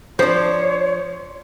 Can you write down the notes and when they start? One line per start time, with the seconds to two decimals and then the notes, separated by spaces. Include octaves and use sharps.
0.19 F3 D4 C5 C#5